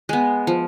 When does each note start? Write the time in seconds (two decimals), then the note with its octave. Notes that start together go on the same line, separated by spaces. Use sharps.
0.09 G#3 B3
0.47 F3